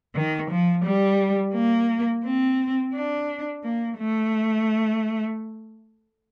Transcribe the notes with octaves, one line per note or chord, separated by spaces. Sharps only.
D#3
F3
G3
A#3
C4
D4
A#3
A3